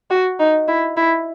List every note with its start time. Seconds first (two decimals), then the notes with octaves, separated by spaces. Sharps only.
0.10 F#4
0.39 D#4
0.68 E4
0.97 E4